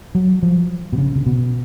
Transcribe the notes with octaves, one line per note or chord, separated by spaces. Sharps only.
F#3
F3
B2
C#3
C#3
B2